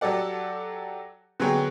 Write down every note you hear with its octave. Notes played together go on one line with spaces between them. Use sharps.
F#3 G4 A4 D5 F#5
D3 F#3 B3 G#4 C#5 G5